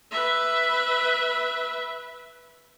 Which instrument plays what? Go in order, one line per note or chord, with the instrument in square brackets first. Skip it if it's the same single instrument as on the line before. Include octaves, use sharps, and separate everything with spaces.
[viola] B4 E5